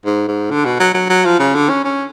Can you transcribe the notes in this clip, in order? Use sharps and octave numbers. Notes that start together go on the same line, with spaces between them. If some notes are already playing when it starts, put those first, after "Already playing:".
G#2
G#2
D3
B2
F#3
F#3
F#3
F3
C#3
D3
C#4
C#4